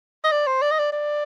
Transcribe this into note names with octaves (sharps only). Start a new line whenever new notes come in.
D#5
D5
C5
D5
D#5
D5
D5